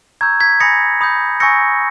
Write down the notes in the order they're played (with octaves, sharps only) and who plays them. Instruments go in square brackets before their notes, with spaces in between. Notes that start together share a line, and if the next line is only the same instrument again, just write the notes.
[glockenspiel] A#5 C#6 E6 G6 G#6
G#6 B6
G#5 B5 D#6 A#6 C#7
B5 D#6 G6
G#5 C#6 E6 G6 A#6 C#7